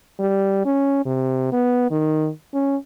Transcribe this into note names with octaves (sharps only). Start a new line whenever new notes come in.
G3
C#4
C3
B3
D#3
C#4